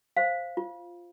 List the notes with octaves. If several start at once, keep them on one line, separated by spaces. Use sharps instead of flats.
C5 F5
F4